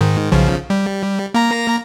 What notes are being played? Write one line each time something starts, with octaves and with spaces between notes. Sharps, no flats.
G#2 D#3
B1 C#3 F3
G3
A#3 A#5 A#6